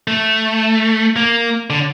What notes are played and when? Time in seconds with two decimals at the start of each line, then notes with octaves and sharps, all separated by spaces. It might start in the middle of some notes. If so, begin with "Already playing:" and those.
0.08 A3
1.16 A#3
1.70 D3